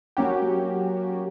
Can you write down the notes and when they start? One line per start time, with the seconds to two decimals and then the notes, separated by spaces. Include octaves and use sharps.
0.17 F#3 A#3 C#4 F#4 G4